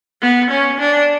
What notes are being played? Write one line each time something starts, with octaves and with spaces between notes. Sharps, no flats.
B3
C#4
D4